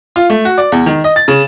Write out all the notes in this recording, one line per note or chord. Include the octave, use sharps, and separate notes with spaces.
F4
A3
F#4
D5
E2
D#3
D#5
A6
C#3